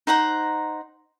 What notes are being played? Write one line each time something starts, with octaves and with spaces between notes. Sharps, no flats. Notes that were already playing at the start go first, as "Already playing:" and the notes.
D#4 C5 F#5 A#5